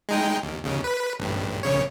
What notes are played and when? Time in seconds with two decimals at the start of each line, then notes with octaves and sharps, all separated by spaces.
0.09 G#3 D#4 G5
0.43 D#2
0.64 D#2 C#3
0.84 B4
1.19 A1 G2
1.63 A#1 C#3 C#5